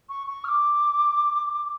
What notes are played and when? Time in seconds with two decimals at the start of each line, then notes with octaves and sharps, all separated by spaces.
0.09 C#6
0.27 C#6
0.44 F6
0.48 D6